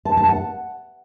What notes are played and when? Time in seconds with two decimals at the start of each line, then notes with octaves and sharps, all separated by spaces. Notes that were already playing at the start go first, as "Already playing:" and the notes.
0.05 A5
0.17 A5
0.29 F#5